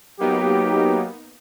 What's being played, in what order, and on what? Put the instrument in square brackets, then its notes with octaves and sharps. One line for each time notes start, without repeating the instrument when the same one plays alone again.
[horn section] F#3 G4 [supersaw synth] A#3 B3 D#4